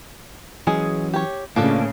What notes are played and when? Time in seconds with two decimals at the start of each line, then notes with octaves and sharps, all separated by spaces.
0.67 E3 F#3 G#3 C#4 G#4
1.13 G4 C#5
1.56 A2 C#3 F3 A#3 D4 A4